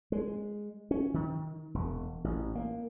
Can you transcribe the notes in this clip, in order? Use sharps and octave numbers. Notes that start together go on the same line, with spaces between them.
G#3
C#4
D#3
E1
A1
A#3